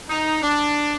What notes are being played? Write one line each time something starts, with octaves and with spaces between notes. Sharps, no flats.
D#4
D4